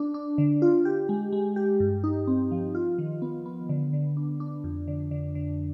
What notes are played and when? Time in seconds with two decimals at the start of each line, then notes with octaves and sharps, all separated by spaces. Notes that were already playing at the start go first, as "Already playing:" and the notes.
Already playing: D4
0.14 D4
0.38 D3
0.62 F4
0.85 G4
1.09 G#3
1.32 G#3
1.56 G4
1.80 G2
2.04 D#4
2.27 C4
2.51 F3
2.75 F4
2.98 D#3
3.22 B3
3.46 B3
3.69 D3
3.93 D3
4.17 D4
4.40 D4
4.64 F2
4.88 D3
5.11 D3
5.35 D3